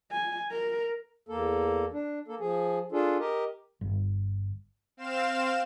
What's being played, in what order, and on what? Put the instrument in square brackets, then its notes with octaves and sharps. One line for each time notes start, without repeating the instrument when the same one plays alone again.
[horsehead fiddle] G#5
A#4
[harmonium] E2 A#3 A4
D4
A#3 A4
F3 G#4
D4 F4 G#4 A4
G4 A#4 D#5
[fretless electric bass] G1
[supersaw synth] C4 F5 E7